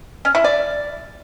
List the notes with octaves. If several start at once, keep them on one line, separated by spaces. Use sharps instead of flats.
C#4
E4
D5